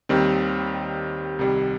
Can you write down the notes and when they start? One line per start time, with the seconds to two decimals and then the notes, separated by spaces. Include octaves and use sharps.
0.09 D#2 D#3 G3 C4
1.39 C2 C3 D#3 G3